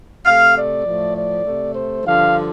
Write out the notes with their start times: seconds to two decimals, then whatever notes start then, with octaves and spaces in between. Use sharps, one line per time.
0.25 C3 A3 F5
0.55 D5
0.84 A2 F3 A3
1.15 D5
1.44 C3 A3
1.74 C5
2.03 G2 D3 F3 F5